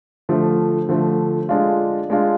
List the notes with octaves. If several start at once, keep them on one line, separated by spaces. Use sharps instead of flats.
D3 F3 A3
D3 F3 A3
G#3 D4 F4
G#3 D4 F4